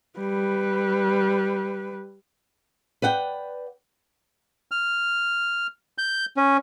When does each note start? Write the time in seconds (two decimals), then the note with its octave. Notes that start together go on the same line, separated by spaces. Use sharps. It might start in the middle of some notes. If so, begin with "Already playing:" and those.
0.18 G3 B4
3.02 B4 D5 F#5 G5
4.71 F6
5.98 G6
6.37 C#4